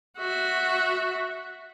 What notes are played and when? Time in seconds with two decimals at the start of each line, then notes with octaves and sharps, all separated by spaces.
0.18 F#4 E5